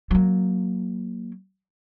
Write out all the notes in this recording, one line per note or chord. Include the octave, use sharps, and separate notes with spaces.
F#3 A#3